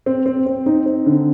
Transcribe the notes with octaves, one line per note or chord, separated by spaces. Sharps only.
C4
C4
C4
D#4
C4
D3